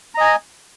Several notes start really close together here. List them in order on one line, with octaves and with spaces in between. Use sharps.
A#5 D#5 G#5